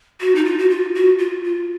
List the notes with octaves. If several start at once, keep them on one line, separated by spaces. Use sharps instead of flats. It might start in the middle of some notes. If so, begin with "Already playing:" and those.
F#4
D#4
F4
F#4
F4
F#4
F4
F4